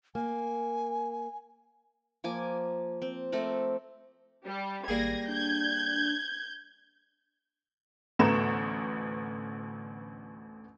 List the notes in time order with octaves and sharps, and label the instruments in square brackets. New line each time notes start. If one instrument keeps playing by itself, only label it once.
[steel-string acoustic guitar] A#3 [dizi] G#5
[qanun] F3 A#3 G#5 D6
C4
A3 C4 A#4 D5
[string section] G3
[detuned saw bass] G#1 [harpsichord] G3 A#3 G#4 [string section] G#6 A#6
[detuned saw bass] D4 [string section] G6 G#6
[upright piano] A1 D2 A3 B3 A#5 E7